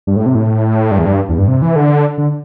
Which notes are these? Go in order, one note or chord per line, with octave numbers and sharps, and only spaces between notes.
G2
A2
C3
A2
G2
E2
G2
E2
G2
C3
E3
D3
D3